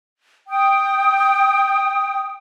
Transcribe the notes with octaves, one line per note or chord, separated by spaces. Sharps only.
G5 D#6